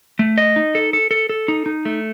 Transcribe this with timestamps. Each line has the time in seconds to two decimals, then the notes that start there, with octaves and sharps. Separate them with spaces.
0.19 A3
0.38 D#5
0.56 D#4
0.75 A4
0.93 A4
1.11 A4
1.29 A4
1.48 D#4
1.66 D#4
1.85 A3